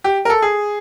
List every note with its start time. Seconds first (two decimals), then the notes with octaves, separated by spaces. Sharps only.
0.04 G4
0.25 A#4
0.30 A4
0.42 G#4